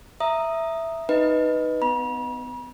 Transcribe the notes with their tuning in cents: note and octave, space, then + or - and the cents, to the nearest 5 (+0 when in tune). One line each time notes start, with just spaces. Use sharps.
E5 +0 A#5 -5 D#6 +0
D#4 +0 B4 +0 D#5 +0
B3 +35 B5 -45